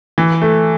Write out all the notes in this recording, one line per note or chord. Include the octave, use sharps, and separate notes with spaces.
E3
A3